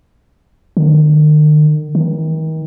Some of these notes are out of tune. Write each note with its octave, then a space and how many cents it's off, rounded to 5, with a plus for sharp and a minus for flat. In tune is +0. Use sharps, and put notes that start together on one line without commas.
D#3 -45
D#3 +35